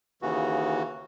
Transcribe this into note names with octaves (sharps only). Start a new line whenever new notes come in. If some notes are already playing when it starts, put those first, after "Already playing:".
D#2 C#3 E3 F#4